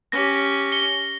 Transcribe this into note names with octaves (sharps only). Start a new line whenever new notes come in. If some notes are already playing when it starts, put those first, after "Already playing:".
C#4 G4 A#6
C#7 G7